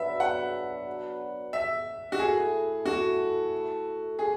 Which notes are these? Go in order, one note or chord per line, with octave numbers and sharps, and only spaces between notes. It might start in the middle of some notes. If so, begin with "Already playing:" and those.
Already playing: F#3 B3 D4 F#4 B4 E5
F#5
E5
F#4
A3 E4 G#4 A4
F#4
G#4